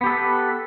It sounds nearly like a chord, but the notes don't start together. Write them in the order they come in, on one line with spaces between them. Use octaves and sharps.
B3 G4 A4 B4